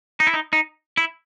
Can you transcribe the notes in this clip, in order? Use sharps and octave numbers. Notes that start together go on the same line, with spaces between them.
D#4
E4
D#4
D#4
E4